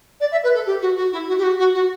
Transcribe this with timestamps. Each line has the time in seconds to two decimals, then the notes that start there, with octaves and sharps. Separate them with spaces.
0.20 D5
0.31 E5
0.43 B4
0.54 A4
0.66 G4
0.81 F#4
0.97 F#4
1.12 E4
1.28 F#4
1.38 G4
1.43 F#4
1.58 F#4
1.74 F#4